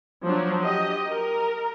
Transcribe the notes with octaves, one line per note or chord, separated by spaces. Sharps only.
F3 F#3 D4
G4 D#5
A#4